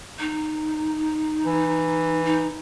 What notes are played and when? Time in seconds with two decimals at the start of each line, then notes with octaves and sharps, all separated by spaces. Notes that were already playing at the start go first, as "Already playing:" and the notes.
0.20 D#4
1.45 E3
2.25 D#4